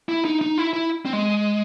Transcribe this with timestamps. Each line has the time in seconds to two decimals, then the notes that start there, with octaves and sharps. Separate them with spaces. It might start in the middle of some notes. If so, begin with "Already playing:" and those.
0.09 E4
0.25 D#4
0.41 D#4
0.58 E4
0.73 E4
1.05 C4
1.13 G#3